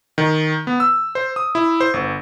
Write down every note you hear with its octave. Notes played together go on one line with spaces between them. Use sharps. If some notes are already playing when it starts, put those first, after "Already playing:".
D#3
B3
E6
C5
D#6
E4
C5
G1